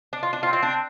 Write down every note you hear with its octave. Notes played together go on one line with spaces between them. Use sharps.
D4
F4
D4
C4 F4
F4
D4